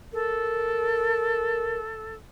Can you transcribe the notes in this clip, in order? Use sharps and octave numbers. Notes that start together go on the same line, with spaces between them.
A4 A#4